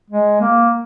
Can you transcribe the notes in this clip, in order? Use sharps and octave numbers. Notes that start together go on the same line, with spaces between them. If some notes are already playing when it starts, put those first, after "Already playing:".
G#3
A#3